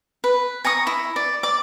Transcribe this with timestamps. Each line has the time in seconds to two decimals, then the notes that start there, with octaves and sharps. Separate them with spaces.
0.24 B4
0.65 G#5 A#5 C#6 D#6
0.87 E4
1.16 D5
1.43 D5 D6